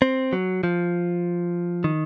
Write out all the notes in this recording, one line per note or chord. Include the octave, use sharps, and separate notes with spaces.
C4
F#3
F3
D#3